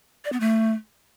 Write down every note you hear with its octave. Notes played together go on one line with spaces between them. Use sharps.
D5
B3
A3